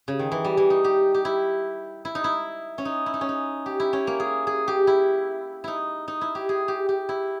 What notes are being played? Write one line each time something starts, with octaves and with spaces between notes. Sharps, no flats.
C#3
D#3
E3
G3
E3
D#4
G4
G4
E4
E4
D#4
E4
C#4
D#4
E4
D#4
C#4
D#4
G4
E4
C#4
A#3
G#4
G#4
G4
E4
D#4 E4
D#4
E4
G4
G#4
G4
G4
E4